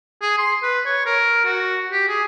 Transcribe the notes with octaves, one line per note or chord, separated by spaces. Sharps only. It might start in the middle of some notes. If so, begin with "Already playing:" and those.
G#4
C6
B4
C#5
A#4
F#4
G4
G#4